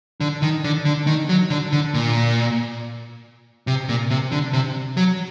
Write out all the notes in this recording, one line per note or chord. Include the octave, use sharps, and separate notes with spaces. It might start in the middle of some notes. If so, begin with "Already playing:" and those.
D3
D#3
D3
D3
D#3
F#3
D3
D3
A#2
C3
A#2
C3
D3
C3
F#3